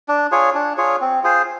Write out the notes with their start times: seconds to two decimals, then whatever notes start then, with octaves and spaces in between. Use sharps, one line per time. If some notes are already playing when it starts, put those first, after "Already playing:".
0.08 D4
0.32 F4 G#4 C#5
0.55 D4
0.78 F4 G#4 C#5
1.01 C4
1.24 F4 G#4 C5